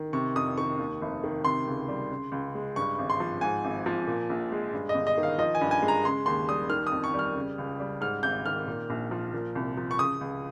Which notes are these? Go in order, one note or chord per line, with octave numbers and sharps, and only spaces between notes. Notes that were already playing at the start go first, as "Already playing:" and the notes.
Already playing: D#3
C3 C#6
F2 D#6
D#3 C#6
D#2
F1
D#3
C3 C6
C#2
G3
C#3
C#2
G#3
G2 C#6
G#1
C6
F3
G#2 G#5
G#1
F3
A#2
A#1
G#3
G2
D#5
G1
D#5
D#3
F5
F3 D#5
G#5
G2
G#5
G#3
A#5
C#3 C6
D#2 C6
G3 D#6
D#3 F6
F2 D#6
C#6
G3
F6
C#3
C#2
G3
G#2 F6
G#1 G6
D#3 F6
A#2
A#1
F3
A#2
C2
F3
C#6
C#3 D#6
C#2